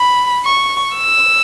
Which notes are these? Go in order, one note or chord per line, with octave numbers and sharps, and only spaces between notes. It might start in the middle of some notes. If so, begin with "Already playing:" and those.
Already playing: B5
C#6
E6